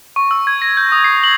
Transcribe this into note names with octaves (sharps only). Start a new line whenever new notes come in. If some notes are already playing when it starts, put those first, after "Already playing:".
C#6
E6
G#6
A#6
G6
D#6
C7
F#7